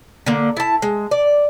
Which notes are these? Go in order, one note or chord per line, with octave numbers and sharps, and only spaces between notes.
D3 A#3
E4 A5
G#3
D5